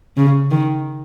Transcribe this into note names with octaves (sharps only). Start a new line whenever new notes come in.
C#3
D#3